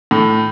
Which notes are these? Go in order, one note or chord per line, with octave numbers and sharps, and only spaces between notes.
A2